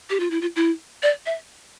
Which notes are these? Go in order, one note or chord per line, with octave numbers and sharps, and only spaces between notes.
G4
F4
E4
F4
E4
D5
E5